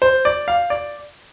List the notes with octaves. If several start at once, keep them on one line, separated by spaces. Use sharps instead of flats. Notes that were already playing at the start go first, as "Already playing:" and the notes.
C5
D5
F5
D5